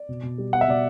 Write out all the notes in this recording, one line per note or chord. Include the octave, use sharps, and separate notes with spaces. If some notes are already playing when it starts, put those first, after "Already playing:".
Already playing: D5
B2
B2
G3
B3 F#5
E5
B2 D5